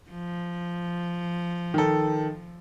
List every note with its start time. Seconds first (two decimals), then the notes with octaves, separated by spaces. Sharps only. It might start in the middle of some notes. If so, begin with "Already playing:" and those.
0.10 F3
1.74 D#3 A4